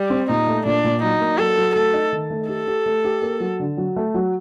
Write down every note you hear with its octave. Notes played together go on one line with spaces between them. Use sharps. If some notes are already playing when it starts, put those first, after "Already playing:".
Already playing: G3
C4
A#2 D#4
A3
A#2 D4
A#2
F#3 D#4
A#3
F#3 A4
F#3
A3 A4
D#4
D#3
A3
G4 A4
G4
A3
G4
A#3
F#3
D3
F#3
A3
F#3